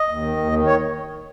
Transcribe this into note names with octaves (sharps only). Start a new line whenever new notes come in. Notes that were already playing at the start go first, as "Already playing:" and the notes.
Already playing: D#5
D#2
D#3
D#2
D#3
C#5